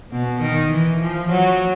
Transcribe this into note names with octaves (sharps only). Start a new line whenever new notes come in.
B2
D#3
E3
F3
F#3